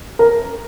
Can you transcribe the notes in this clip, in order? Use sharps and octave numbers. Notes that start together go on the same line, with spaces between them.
A#4